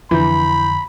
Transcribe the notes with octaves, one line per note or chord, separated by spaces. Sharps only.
F2 D3 E3 B5 G6